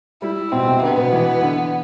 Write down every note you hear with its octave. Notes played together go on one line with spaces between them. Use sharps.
G3 E4
B2 C4
C3
D3 B3
B2
E3
D3